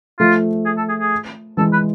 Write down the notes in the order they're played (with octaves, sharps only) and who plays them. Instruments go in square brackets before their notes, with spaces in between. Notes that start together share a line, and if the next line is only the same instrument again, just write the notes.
[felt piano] F3 A3 [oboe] F4
[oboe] G#4
A4
G#4
G#4
[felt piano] E3 G#3 [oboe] A4
[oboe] B4